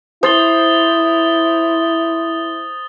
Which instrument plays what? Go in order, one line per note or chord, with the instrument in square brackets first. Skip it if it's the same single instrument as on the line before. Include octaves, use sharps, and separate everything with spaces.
[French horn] E4 [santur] C5 [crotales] D#6 A6 G7